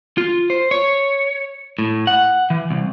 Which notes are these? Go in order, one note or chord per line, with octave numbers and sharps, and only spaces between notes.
F4
C5
C#5
A2
F#5
E3
C2